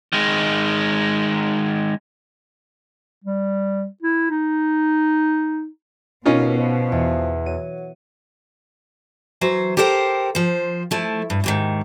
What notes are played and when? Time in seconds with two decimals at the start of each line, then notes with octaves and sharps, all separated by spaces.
0.13 D#3 G#3
3.24 G3
4.03 E4
4.30 D#4
6.26 D#2 B2 C#4 D#4 F4
6.59 F3
6.92 E2
7.46 F#3 D#7
9.41 E3 F#3 C5
9.77 G4 A4 A#4 C5 F#5 G5
10.35 F3 C5
10.91 F3 A3 E4
11.30 G2
11.44 D#2 G#2 D#3